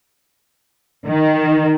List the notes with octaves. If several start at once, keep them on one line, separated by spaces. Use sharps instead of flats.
D#3